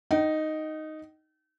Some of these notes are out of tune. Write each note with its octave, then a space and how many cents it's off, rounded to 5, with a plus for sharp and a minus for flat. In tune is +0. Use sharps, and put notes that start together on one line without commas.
D#4 +0 G5 -40